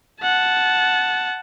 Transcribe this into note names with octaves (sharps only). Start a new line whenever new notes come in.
F#5 A5